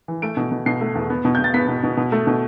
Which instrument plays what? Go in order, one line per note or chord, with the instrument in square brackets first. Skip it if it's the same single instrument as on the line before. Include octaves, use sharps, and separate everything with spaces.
[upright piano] E3
A3 D7
B2
B2
B2 C7
A3
E2
B3
B2
B2 G6
A6
B3 B6
B2
B2
B2
A3
B2